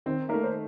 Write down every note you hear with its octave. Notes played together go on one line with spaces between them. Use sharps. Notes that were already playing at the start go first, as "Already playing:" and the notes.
D#3 C4
A3 A#3 D#4 A#4
C5